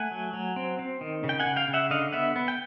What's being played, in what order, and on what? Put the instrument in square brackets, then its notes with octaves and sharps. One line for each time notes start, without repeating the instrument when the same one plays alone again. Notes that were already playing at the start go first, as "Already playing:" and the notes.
Already playing: [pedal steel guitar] A3 F#5 G#5
F#3
F#3
C4
C4
D#3
C#3
G5
F#5 G#5
C#3
F5 G5
C#3
E5 F#5
D3 D#5 F5
B3 E5 F#5
B3
G5